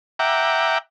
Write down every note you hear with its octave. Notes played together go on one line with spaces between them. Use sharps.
E5 F#5 G5 A#5 D6